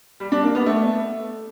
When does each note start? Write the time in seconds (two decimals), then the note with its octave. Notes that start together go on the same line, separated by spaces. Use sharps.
0.20 G3
0.32 D4
0.43 A#3
0.55 B3
0.66 A3